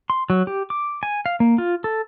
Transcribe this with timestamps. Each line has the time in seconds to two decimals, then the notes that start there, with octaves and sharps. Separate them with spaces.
0.10 C6
0.30 F#3
0.47 G4
0.70 D6
1.03 G#5
1.26 F5
1.40 A#3
1.58 F4
1.84 A4